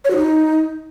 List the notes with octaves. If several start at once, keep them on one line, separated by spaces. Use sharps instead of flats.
C#5
F#4
D#4